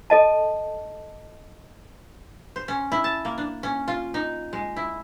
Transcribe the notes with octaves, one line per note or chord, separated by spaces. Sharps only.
A4 D#5 A5
C5
C#4
E4
A5
A#3
D4
C#4
F4
D#4
G#3
E4